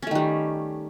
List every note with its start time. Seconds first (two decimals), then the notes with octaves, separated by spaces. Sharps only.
0.03 C#4
0.07 A3
0.11 D#3
0.15 G3